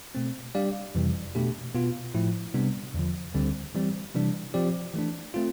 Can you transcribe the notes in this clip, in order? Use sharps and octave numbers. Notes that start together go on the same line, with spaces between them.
B2 A3 C4
G3 D4 G4 D5 F5
F2 C3 E3 G3
B2 A3 D4 G4
B2 B3 F4
A2 F3 A3 E4
C3 G3 B3 D4
E2 D3 F3
D2 D3 G3 C4
E3 G3 C4
C3 E3 G3 D4
F3 C4 G4 D5
E3 A3 D4
A3 C4 F4